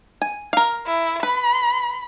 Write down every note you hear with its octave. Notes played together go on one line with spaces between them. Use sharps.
G#5
A#4 F5
E4
B4 B5